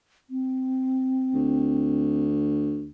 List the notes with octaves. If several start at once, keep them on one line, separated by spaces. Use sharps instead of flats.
C4
D2